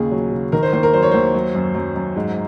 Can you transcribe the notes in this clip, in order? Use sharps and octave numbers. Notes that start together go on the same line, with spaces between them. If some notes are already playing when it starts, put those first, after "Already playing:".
Already playing: D#2 A#2 C#3 G#4
F#3
C#3
D#3 A#4
C5
D#2 C5
A#4
F#3 C5
C#5
D#2 C5
F#3
F#2
F#2
F#2
G#2